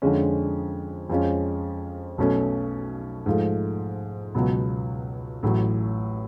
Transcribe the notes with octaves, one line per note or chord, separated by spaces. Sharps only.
F2 D3 F3 G#3 C#4
F2 F3 G#3 C#4
B1 B2 A3 C#4
G#2 F3 A3
C#2 B2 F#3 B3
A1 A2 F#3